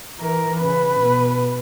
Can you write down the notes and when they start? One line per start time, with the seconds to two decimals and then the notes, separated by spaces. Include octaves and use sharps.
0.20 E3 A#4
0.60 C#3 B4
1.00 B2